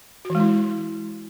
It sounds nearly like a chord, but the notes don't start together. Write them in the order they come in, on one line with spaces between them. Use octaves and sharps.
F#4 E3 G#3 E4